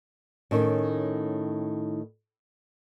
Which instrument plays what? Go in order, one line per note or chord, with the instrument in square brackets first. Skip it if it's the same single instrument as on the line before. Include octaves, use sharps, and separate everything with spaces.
[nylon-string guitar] A2 D#3 C#4